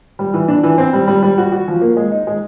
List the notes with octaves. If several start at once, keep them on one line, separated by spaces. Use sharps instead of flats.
G3
E3
D4
E3
C4
G3
G3
G3
F#4
F#4
F3
A#3
G#3
D#4
G#3